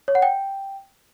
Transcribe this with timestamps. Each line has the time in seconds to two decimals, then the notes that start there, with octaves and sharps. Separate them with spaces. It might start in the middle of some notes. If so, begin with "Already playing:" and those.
0.08 C#5
0.15 F#5
0.22 G5